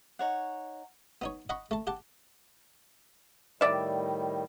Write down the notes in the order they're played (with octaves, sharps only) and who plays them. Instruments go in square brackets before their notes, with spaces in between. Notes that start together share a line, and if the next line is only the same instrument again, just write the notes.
[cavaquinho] D#4 C#5 F#5
[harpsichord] B3 D#4 C#5
D#5 F#5 B5 C#6
A3 A5
G4 F#5 A5
[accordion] A2 D#3 G3 [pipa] D5 E5